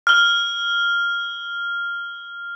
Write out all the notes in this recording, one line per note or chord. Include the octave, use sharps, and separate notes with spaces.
F6 G7